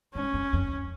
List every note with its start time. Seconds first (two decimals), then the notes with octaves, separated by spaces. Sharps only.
0.14 G#2 C#4
0.33 F2
0.53 F2
0.68 F#2